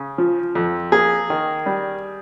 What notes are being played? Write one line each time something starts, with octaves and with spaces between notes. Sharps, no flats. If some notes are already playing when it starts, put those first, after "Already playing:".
Already playing: C#3
F3
F2
A#3 G#4
D#3
G3